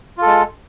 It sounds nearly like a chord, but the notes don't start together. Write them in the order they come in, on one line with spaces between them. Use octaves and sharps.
F4 A4 G#3